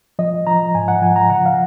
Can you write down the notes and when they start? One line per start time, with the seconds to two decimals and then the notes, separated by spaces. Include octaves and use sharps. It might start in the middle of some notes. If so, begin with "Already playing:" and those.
0.19 F3 D#5
0.47 F3 A#5
0.75 G#2 G#5
0.88 F#5
1.02 F3 G#5
1.16 A#5
1.30 C#3 F#5
1.46 F5